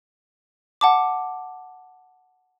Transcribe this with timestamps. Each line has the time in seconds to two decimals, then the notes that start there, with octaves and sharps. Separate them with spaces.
0.81 F#5 A5 D6